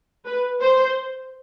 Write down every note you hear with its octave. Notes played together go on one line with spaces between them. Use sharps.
B4
C5